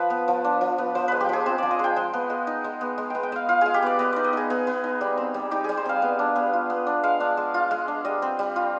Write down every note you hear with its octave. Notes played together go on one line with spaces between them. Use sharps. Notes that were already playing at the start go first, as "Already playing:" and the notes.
Already playing: F3 B4
B3
F3
D4
F3
B3
F3 C5
G#3 B4
G4
F3 G#4
C4 C5
F3 D5
D#5
G#3 G5
G#3
B3
G#3
D#4
G#3
B3
G#3
B3 G5
G5
G#3 F5
F4 F5
G#3 G#4
G4
B3 D5
B3 D#5
D#4 D5
D#5
D#4 G#4
B3 G#4
B3
D#4
G3
C4
G3
D#4 G4
G3 G#4
C5
C4 F5
B3
D4
B3
F4
B3
D4
G#3 F5
D4
G#3
F4
G#3
D4
G3 D#5
C4
G3
F4